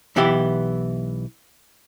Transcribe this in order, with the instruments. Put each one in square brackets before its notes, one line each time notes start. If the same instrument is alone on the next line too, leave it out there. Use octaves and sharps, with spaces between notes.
[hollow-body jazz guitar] B1 E3 B3 E4 G4